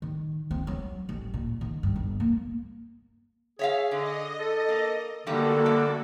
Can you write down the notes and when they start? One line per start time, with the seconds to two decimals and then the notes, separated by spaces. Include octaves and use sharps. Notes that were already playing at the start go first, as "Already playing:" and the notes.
0.02 D#3
0.51 C4
0.67 F#3
1.09 A1
1.34 A#2
1.61 D#3
1.83 G2
1.96 G1
2.20 A#3
3.59 G#4 C#5 E5 F5
3.91 D3 D#5
4.39 A4
4.69 A#3
5.27 G2 D3 D#3 G3 A#3 F#4 A4
5.66 G3 D5 E5